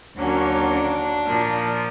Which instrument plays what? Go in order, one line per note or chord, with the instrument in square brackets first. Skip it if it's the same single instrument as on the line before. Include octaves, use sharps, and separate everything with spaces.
[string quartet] D#2 D3 F#3 A#3 C#4
D4
A#2 F3 A#3